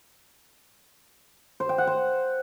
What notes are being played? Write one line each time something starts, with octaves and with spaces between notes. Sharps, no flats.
C5
G5
F#5
C5